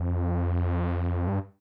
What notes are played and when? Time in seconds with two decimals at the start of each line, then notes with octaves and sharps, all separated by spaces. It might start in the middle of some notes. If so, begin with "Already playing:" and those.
Already playing: F2
1.27 G2